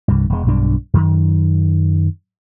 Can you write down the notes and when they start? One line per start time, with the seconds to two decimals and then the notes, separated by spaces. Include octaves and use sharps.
0.08 C2 G2
0.30 E1 G#3
0.47 B1 G2 D4
0.94 F#2 D#3